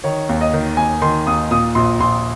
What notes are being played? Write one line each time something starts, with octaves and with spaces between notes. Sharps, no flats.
D#3 C#5
D#2
D#5
D#3
D#2 G#5
D#3 C6
D#2 D#6
A#2 D#6
A#1 C6
A#1 C6